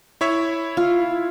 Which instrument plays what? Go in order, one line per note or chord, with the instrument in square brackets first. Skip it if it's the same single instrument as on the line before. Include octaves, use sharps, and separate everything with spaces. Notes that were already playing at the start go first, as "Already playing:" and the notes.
[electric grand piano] E4 C#5 E5
[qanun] F4